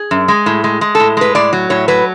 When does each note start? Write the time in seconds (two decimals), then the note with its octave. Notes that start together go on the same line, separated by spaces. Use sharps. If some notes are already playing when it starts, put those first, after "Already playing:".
Already playing: G#4
0.11 F#2
0.28 G#3
0.46 A2
0.64 G#3
0.81 G#3
0.95 A2 A4
1.17 G#3 B4
1.35 A2 D5
1.53 F#3
1.70 A2 C#5
1.88 F#3 B4